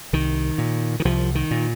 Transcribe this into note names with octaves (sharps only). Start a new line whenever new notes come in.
C2 D#3
A#2
D#3
C2 F3
D#3
A#2